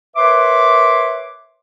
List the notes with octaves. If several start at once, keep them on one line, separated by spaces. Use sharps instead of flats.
A#4 B4 C#5 E5 C6 D6